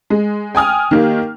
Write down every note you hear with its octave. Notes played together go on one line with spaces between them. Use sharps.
G#3
G5 G#5 D#6 F6
D#3 A#3 G4